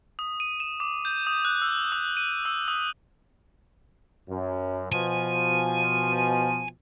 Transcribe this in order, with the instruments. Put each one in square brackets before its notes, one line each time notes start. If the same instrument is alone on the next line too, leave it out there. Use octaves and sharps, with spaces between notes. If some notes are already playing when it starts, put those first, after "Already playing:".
[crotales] D#6
D#7
E7
D6
G6
D#6
F#6
E6
D#6
D#7
E6
D#6
[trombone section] F#2
[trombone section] B2 F3 [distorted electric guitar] G#5